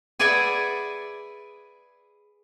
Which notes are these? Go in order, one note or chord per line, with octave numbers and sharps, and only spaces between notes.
G#4 B4 D5 E5 F#5 G#5